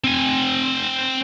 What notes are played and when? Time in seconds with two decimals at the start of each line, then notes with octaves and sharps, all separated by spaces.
0.04 C4 G#5